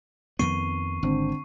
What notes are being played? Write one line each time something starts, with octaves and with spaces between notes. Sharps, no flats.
F2 D#3 B3 C#6 C7 D#7
G#1 D3 C4